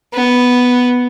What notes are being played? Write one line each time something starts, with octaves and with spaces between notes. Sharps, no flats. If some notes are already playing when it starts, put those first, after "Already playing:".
B3